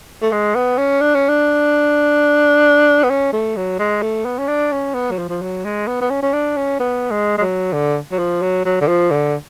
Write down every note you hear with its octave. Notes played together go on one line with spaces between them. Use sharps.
A3
G#3
B3
C#4
D4
C#4
D4
B3
C#4
A3
F#3
G#3
A3
B3
C#4
D4
C#4
B3
F#3
F3
F3
F#3
G#3
B3
B3
C#4
C#4
D4
C#4
B3
G#3
G#3
F#3
D3
F#3
F3
F#3
F#3
D3
F3
D3